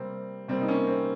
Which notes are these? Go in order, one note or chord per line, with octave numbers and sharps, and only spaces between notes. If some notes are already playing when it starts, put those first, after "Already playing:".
Already playing: C3 G3 A#3 C4
C3 G3 A#3 C4
D#4
A#3 C#4
C4